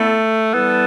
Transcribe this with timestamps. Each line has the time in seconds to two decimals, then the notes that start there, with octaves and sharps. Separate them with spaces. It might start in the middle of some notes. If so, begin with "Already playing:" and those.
Already playing: D3 A3 B3 E4 A4
0.53 E3 G3 B3 E4 A4